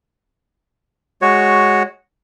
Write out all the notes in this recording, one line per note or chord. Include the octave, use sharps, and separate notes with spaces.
G#3 F#4 C#5